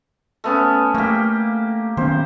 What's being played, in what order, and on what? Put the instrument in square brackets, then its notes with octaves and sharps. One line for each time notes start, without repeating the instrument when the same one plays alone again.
[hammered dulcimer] A3 B3 C#4
[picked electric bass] A3 [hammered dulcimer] A#3 G4
[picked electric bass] D#3 B3 C#4 [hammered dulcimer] C5